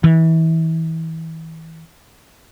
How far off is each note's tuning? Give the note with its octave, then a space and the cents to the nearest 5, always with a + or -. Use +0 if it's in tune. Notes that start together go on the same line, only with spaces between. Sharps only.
E3 -30